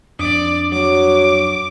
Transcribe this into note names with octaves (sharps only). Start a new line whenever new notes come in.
F2 D4 D5 D6 D#6
F#3 D6